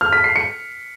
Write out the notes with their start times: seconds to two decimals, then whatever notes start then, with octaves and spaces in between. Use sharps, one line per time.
0.01 F6
0.13 B6
0.24 C7
0.36 C#7